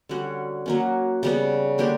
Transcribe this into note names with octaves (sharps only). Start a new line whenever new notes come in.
D3 G3 C#4 F#4
F#3 A#3 C#4
C#3 G3 B3
D3 A#3 D4 G4